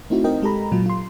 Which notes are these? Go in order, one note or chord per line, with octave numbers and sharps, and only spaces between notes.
A3 C4 D#4 E4 F#4
C4 D#4 A#4 D#5 G5
G#3 G4 A4 A#5 B5
A#2 F#3 F4
F4 C6